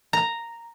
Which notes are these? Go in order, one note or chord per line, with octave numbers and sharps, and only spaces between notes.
A#5